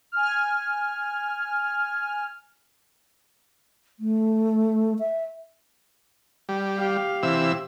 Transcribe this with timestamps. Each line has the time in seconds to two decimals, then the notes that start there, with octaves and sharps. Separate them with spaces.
0.12 G#5 F6
4.00 A3
4.99 E5
6.49 G3
6.78 G4 F5
7.23 C3 E3 E6